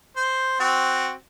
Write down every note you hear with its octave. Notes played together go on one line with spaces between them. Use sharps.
C5
C4 F#4